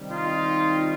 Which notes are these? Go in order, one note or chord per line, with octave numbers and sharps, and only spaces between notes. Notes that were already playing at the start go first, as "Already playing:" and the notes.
Already playing: C3 D#3 G3
D#4 F4